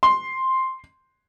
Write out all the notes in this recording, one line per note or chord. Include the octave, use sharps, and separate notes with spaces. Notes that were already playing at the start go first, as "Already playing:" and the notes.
C6